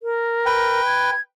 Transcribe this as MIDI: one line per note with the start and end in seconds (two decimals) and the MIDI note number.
0.03 0.85 70
0.46 1.10 71
0.46 1.10 79
0.86 1.20 92